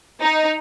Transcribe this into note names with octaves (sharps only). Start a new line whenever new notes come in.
D#4